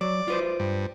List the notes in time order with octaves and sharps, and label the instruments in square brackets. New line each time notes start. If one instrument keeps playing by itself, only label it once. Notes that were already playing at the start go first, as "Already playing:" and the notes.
[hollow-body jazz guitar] F#3 [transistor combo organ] D5
[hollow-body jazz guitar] F4 B4 C5
[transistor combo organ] G2